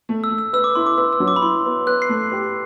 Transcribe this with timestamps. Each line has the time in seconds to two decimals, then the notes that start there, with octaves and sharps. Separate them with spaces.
0.09 A3
0.24 E6
0.31 A3
0.38 E6
0.53 B4 E6
0.64 D6
0.75 E4 C6
0.86 D6
0.98 B4 E6
1.13 E6
1.20 F#3
1.28 D6
1.36 B5
1.42 E4 C6
1.65 B3
1.87 B4 F#6
2.02 C7
2.09 A3
2.32 G4